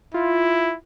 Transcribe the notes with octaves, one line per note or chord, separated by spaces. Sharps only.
E4 F4